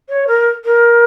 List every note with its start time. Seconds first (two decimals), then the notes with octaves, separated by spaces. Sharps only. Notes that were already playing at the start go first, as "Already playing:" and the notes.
0.09 C#5
0.27 A#4
0.65 A#4